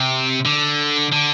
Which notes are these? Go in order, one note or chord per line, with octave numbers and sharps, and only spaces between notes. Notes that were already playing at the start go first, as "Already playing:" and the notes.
Already playing: C3
D3
D3